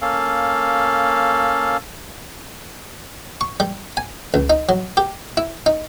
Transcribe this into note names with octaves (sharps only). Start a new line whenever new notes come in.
A#3 C#4 A4 F5
C#6
G3
G#5
C#2
D#4
F#3
G4
E4
D#4